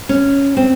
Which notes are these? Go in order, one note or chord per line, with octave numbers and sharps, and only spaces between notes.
C#4
C4